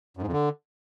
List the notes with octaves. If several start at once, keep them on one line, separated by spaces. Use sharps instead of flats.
F#2
G#2
F2
D3